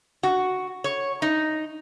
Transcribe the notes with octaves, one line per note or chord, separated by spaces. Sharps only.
F#4
C#5
D#4